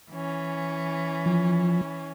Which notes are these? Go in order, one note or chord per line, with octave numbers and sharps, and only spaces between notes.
E3 C#4
F3